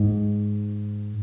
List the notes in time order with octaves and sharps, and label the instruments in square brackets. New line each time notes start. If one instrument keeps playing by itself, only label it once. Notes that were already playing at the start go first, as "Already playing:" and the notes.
Already playing: [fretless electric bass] G#2